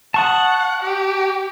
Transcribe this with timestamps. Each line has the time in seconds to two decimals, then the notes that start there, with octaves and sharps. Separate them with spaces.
0.14 F#5 A5 C#6 D#6
0.83 G4